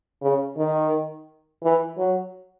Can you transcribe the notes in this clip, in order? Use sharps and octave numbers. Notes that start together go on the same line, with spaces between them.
C#3
D#3
E3
F#3